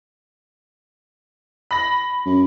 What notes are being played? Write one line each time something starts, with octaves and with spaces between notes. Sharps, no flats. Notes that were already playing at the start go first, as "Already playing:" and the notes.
B5 A#6
F#2